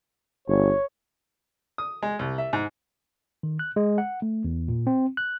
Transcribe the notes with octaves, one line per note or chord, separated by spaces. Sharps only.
G1 C#5
D#6
G#3
C2
E5
G#2
D#3
F#6
G#3
F#5
A3
E2
A#2
C4
F#6